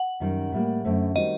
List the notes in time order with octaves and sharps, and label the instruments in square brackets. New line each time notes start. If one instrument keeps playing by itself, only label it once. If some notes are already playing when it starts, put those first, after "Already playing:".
Already playing: [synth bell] F#5
[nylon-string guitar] F#2 D#3 G3
A2 G3 A#3
F#2 D3 A3 C4
[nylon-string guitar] D#3 G3 C4 F#4 [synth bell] D#5